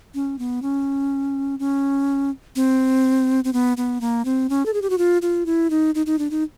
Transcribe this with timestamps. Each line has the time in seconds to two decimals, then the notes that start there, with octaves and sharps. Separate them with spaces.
0.15 C#4
0.39 B3
0.62 C#4
1.59 C#4
2.56 C4
3.44 C4
3.53 B3
3.77 B3
4.01 A#3
4.25 C4
4.49 C#4
4.66 A4
4.74 G#4
4.82 G4
4.90 F#4
4.98 F4
5.22 F4
5.46 E4
5.70 D#4
5.95 D#4
6.06 D#4
6.19 D4
6.31 D#4